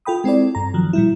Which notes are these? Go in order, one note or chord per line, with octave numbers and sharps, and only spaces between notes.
F4 A4 G5 B5 D#6
G#3 C4 E4 A4 D5
G2 A#5
D#3 F3 F#3
A#2 G3 E4